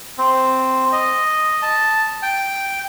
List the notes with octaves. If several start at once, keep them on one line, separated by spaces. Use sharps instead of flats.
C4
D#5
A5
G5